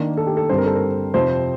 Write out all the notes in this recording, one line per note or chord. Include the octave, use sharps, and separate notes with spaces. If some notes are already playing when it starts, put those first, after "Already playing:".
Already playing: D#3 A#3 D4
A4
G4
A4
G2 D3 G3 C4 C5
A#4
A4
A#4
F2 C3 F3 C4 C5